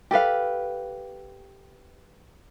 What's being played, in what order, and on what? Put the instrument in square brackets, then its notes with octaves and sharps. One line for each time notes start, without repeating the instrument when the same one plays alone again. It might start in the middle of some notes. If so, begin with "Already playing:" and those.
[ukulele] G4 A4 B4 F5